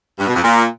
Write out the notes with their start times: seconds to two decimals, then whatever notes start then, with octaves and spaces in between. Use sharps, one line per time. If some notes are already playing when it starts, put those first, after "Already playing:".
0.19 G2
0.27 B2
0.35 F2
0.43 A#2